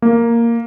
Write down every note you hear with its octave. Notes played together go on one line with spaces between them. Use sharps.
A#3